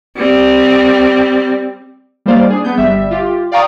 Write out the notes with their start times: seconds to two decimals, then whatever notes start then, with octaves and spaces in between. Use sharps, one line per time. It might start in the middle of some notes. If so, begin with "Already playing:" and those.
0.16 G3 C4
2.26 G3 A#3 D#4 C5 D5 F5
2.50 D4 G#4
2.64 B3 G6
2.77 G1 G3 E5
3.11 F4 G4
3.52 D5 F5 G5 A#5 C#6 D#6